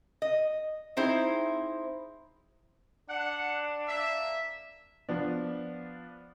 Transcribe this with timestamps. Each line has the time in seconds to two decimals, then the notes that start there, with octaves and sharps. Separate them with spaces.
0.22 D#5
0.97 C4 D#4 E4 G#4 C5
3.09 D4 F#5
3.88 A#3 E5
5.09 F3 B3 D4